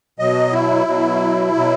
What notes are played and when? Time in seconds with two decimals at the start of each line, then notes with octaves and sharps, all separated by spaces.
0.19 B2 F#3 D#5
0.52 E4
0.87 B2 F#3
1.53 B2 F#3